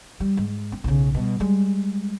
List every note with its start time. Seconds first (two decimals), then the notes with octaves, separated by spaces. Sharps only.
0.20 G3
0.37 G#2
0.72 C4
0.84 B1 C#3
1.14 B2 G3
1.40 G3 G#3